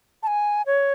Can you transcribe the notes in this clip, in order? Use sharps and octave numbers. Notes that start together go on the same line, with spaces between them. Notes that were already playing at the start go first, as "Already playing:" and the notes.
A5
G#5
C#5